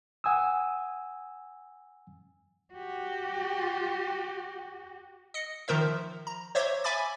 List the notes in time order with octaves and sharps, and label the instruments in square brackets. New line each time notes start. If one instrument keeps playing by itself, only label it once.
[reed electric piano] F#5 G#5 D#6 E6
[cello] F#4 G4
[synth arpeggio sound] D#5 C#7
D#3 F3 A#4 C5 E5
A#5
C5 C#5 E5 D6 G#6 B6
E5 G#5 B5 D6 A6